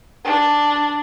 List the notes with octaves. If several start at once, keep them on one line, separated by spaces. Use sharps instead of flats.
D4